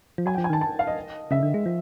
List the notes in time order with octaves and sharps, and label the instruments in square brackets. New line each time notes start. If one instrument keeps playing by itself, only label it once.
[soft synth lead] F3
[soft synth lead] F#3 [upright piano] G#5
[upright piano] G5
[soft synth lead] F3
[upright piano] G#5
[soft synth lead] D#3 [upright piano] A5
[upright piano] A5
F5
D#5
[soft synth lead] C#3 [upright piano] E5
[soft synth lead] D3
G#3
F3